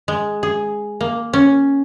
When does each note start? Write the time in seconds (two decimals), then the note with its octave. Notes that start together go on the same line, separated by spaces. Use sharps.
0.08 G#3
0.43 G#4
1.01 A#3
1.33 C#4